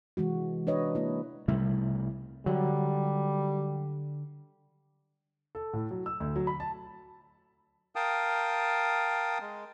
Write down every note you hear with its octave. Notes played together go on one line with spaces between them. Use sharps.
C3 E3 G#3 F#4
D4 B4 C#5 D#5
A#3 E4
C2 C3 G3 A3 E4
D3 F#3 G3
A4
A2
F#3
E6
D2
F#3
B5
A5
A#4 F5 G5 A5 D#6
G#3